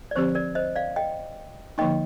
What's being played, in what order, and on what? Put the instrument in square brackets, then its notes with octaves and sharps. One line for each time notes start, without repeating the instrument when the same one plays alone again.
[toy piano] D5
[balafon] D3 F3 C4 G4 [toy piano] C5
[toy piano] A#4 D5
C5 D#5
D5 F5
D#5 G5
[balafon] D3 F3 A#3 D#4 [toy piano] D#5 G5